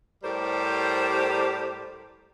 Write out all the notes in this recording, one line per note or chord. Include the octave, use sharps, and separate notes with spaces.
A2 G3 G4 A#4 C5